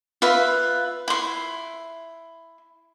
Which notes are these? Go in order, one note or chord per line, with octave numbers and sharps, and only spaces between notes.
F4 B4 E5
E4 C6